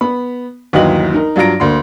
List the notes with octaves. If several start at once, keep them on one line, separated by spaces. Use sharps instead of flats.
B3 B5
G1 D#2 E3 F#3 D#5 F#7
D#4 A#4
G2 F#3 F4 A#5 A#6 D7
D2 A#3 C6